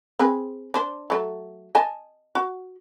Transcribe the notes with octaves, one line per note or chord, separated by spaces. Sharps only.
C4 G#4 B4
D4 C5
F#3 A3
D#5 G#5 A5
F#4